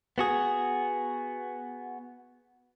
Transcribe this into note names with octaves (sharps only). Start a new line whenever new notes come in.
B3 F#4 G#4